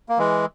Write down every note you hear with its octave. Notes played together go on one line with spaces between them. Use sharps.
A#3
E3 G#3